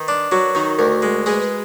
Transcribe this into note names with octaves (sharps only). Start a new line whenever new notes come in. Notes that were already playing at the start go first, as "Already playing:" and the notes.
Already playing: D#3 B4
D4
F#3 F#4 A#4
D#3 D#4 F#4
D2 F#4 A#4
G#3
G#3 G#4 B4
G#4 B4